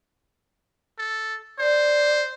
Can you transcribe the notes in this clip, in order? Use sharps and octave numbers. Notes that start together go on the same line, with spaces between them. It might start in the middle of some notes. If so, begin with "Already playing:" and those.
A4
C5 D5